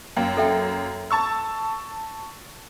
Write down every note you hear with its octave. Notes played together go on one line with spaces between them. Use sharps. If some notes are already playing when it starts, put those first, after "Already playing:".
F#2 A#3 G5
A4 E5 G5
A5 C#6 E6